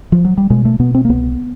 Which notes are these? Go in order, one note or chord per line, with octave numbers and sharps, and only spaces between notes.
F3
F#3
G3
B2 G#3
A3
B2 B3
C4
A#3
C2 B3